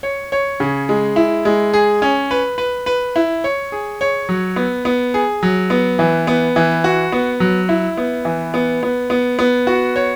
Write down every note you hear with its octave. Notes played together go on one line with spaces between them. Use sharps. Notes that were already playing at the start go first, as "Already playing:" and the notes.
C#5
C#5
C#3
G#3
E4
G#3
G#4
C#4
B4
B4
B4
E4
C#5
G#4
C#5
F#3
B3
B3
G#4
F#3
B3
E3
B3
E3
F#4
B3
F#3
E4
B3
E3
B3
B3
B3
B3
F#4
C#5